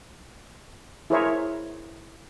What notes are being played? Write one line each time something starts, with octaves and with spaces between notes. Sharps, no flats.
E4 G#4 A#4 C5 C#5 E5